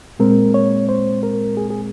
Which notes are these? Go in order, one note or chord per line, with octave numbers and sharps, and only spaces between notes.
A#2 G#3 C4 A#4
C#5
C5
A#4
G#4
G#4